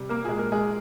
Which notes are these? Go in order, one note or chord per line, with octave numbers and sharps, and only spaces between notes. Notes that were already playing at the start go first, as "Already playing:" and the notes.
Already playing: C3 G3
A#3 A#4
A#2 G#3 G#4
A#4
G#3 G#4